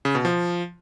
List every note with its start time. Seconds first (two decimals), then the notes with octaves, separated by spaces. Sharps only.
0.05 C#3
0.15 B2
0.25 F3